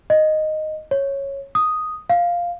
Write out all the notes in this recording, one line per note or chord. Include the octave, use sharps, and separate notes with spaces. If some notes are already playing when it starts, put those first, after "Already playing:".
D#5
C#5
D#6
F5